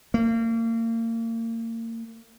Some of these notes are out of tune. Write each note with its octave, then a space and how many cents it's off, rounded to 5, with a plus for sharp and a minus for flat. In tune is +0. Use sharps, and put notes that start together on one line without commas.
A#3 -35